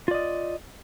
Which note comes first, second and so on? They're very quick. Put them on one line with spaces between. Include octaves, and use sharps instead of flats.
F4 D5 D#5